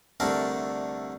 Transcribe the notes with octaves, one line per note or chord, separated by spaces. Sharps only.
C2 D3 A3 A#4 D5